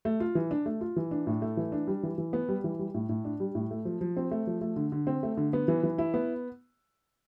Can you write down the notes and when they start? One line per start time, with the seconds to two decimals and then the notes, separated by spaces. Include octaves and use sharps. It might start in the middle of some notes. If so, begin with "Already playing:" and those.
0.05 A3
0.20 F4
0.35 E3
0.51 D4
0.66 A3
0.81 F4
0.96 E3
1.11 D4
1.27 A2
1.42 A3
1.57 E3
1.72 D4
1.87 G3
2.03 E3
2.18 E3
2.33 B3
2.49 G3
2.64 E3
2.79 G3
2.94 A2
3.09 A2
3.25 D4
3.40 G3
3.55 A2
3.71 A3
3.85 F3
4.01 F3
4.17 C4
4.31 A3
4.47 F3
4.61 A3
4.76 D3
4.92 D3
5.07 C4
5.23 A3
5.37 D3
5.53 B3
5.68 E3
5.83 E3
5.98 E4
6.14 B3